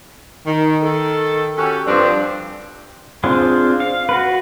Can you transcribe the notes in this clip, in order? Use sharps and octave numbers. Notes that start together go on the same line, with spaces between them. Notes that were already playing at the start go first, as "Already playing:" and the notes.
D#3
D#3 A4
C#4 F#4 G4 A4
G2 F3 C4 D4
C4 D4 F4 G#4
F5
F#4 B4